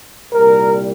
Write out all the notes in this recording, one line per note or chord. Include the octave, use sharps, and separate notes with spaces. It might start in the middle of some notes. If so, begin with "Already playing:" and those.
C2 A#2 G3 A#4